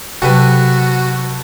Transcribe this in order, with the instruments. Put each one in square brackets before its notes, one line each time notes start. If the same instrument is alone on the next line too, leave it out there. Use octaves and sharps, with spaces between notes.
[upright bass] C3 F#3 [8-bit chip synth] F#4 [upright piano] G4 A4 B4